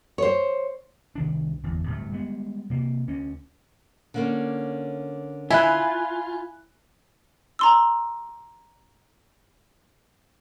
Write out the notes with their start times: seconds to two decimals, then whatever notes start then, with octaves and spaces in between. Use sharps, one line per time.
0.18 C5 C#5
1.15 C2 D#3 D4
1.63 G1 E2
1.85 D1 G2 A3
2.12 G3 G#3 B3
2.70 C3 A#3
3.08 D2 C#4
4.14 D3 A#3 C#4
5.50 E4 F4 G#5 B5 F#6
7.59 A#5 C6 E6